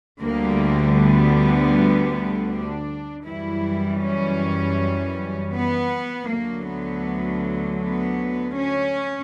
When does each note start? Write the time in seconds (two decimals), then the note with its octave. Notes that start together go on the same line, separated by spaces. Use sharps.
0.21 D2 D3 G3 A#3
0.98 B3
2.49 D4
3.25 F#2 E3 G3 E4
4.02 C#4
5.53 B3
6.29 D2 D3 F#3 A#3
6.68 B3
7.81 B3
8.57 C#4